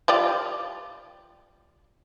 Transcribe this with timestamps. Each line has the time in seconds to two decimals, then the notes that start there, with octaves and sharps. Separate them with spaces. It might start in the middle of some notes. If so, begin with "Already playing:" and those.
0.08 G3 F4 D5